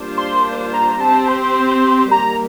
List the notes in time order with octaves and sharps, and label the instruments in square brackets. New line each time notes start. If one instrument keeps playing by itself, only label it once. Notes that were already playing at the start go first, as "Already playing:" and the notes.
Already playing: [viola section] G3 A#3 D4 F4 C5
[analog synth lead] C6
A#5
[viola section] C4 G4 C5 [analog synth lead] A5
[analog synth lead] C6
[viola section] D#3 G3 A#3 [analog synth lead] A#5